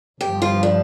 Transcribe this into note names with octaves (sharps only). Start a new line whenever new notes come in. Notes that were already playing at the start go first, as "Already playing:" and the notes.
G1 G2 F3 G4
F4
D4